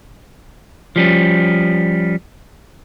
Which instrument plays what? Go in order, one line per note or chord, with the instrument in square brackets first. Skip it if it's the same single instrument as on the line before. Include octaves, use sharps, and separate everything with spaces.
[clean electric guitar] F3 G3 C#4